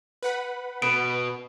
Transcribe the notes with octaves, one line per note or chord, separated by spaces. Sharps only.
B4 F#5 B5
B2 B3 D7